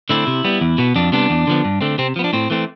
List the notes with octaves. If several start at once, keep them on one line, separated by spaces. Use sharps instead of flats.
D3 A3 C4 E4
C3
G3 B3
E2
B2 B3
F2 D4
C3 G3 B3 D4
E2
D3 F3 B3
G2
D3 A3 C4
C3 C4
F3 B3
D4
A2 C4
E3 A3 C4